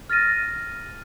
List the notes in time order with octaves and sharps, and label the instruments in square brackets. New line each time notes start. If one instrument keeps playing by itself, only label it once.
[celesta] F6 A6 A#6 D#7